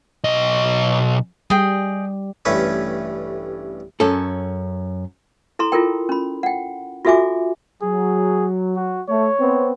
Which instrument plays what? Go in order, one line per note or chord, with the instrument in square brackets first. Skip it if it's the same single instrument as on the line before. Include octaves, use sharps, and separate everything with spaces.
[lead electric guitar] B1 D#5
[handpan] G3 [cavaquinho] G#4 D#5 G5
[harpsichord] A1 G2 A3 C#4 B4 C#5
[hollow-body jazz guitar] F#2 C#4 A4
[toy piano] E4 A4 A#5 C6
E4 F4 A4 A#4 G5
C#4 B5
F#5 G5
F4 F#4 A4 E5 G#5 D6
[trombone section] F#3 [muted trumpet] G#4
[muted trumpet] F#4
[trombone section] A3 [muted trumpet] C#5
[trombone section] B3 C4